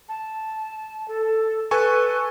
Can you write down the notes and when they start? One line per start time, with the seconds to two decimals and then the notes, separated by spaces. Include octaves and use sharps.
0.09 A5
1.08 A4
1.71 A4 B4 G#5 C#6